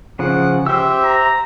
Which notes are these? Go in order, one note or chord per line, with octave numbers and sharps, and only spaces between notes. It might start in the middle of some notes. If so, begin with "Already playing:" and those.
C#3 F3 F#5
G4 C5 E5 E6
A#5